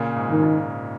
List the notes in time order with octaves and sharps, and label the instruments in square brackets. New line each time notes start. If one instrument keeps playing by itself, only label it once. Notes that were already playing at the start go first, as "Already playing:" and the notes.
Already playing: [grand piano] A#2 C#3
G#2
[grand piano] G#2 [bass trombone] D#3
[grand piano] A#2